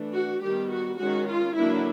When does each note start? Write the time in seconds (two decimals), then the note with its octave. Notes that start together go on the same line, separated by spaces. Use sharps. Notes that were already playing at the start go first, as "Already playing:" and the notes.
Already playing: E3 A3 D4
0.14 F#4
0.42 D#3 G3 B3 G4
0.71 F#4
0.99 D#3 G#3 C#4 F#4
1.28 F4
1.56 D3 F#3 A#3 D4 E4